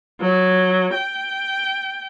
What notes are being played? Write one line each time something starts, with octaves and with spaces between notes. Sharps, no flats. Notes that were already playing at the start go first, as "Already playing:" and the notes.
F#3
G5